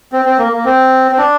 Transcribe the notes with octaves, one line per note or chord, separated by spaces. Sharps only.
C4
C4
A#3
A#3
C4
C4
D4